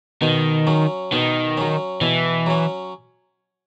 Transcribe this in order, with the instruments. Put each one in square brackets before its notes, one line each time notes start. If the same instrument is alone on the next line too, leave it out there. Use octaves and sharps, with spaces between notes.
[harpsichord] B2 [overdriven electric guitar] D#3
[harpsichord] F#3 C#4
[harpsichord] B2 [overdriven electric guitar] D#3
[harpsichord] F#3 C#4
[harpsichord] B2 [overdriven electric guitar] E3
[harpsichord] F#3 C#4